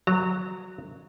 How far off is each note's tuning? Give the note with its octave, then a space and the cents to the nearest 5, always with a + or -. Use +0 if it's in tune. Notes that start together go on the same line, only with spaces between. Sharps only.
F#3 +0 A#5 -25